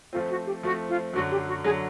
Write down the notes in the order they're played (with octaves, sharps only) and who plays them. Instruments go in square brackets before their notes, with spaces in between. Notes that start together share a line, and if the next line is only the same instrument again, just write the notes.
[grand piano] F3 A3 C4 [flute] F4
[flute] F#4
G4
[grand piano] F3 A3 C4 [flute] F#4
[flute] F4
[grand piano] F#2 D3 F#3 [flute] F#4
[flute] G4
F#4
[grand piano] D3 F#3 [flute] G#4